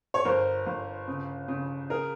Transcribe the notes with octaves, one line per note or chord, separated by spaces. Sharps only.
C#5
G1 A#4 C5
G1
C#3
C#3
G#4 A#4